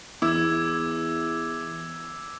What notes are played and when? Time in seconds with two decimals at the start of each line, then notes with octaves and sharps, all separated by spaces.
0.22 E2 E4 D6 E6 G#6